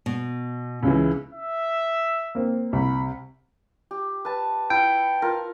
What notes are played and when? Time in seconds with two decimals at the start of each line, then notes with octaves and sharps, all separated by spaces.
0.06 B2
0.83 C#2 C#3 E3
1.33 E5
2.35 A#3 C4
2.73 C2 B5
3.91 G4
4.25 B4 A5
4.70 E4 F#5 G5
5.22 F4 A#4